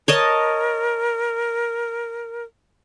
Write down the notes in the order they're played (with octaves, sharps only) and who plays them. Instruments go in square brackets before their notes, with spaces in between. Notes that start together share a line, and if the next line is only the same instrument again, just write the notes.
[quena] A#4 [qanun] C#5 D#5 A5